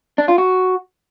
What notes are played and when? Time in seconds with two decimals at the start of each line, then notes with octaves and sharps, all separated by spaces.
0.18 D4
0.28 F4
0.38 F#4